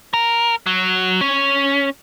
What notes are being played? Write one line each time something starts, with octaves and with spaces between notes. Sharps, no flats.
A#4
F#3
C#4